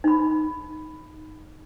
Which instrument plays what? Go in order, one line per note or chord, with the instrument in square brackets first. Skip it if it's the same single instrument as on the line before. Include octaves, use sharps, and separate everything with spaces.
[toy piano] D#4 B5